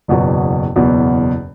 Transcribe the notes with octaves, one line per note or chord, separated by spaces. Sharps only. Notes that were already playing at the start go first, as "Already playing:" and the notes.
F#1 E2 B2 F#3
F#1 E2 B2 F#3